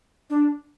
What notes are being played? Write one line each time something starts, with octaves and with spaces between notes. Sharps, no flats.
D4